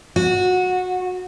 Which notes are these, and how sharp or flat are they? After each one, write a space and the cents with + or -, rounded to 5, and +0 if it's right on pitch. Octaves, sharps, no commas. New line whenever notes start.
F#4 -20